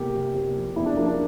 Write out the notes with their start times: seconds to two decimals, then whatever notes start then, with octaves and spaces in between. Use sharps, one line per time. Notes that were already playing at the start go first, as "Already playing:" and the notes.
Already playing: E2 C3 G4 A#4
0.15 C3
0.34 C3
0.56 F3
0.76 E2 E4
0.86 D4
0.96 F3 A#3
1.06 D4